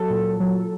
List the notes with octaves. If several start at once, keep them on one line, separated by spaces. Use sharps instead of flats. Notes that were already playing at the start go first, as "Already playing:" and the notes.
Already playing: F#3 A4
A#2
F#3